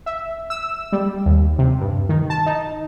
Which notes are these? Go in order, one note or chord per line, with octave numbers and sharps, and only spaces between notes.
E5
E6
G3
D#2
C3
G2
D#3
A5
D#4